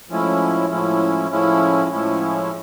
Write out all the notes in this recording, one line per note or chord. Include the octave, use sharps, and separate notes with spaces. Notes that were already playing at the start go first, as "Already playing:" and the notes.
A2 F3 G#3 C#4 E4
A2 F3 G#3 C#4 E4
A2 F3 G#3 C#4 E4
A2 F3 G#3 C#4 E4